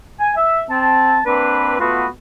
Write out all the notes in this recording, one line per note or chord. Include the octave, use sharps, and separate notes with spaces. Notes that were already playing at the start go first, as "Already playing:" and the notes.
G#5
E5
C4 A5
A#3 C4 D4 B4
A3 B3 F4 F#4 B4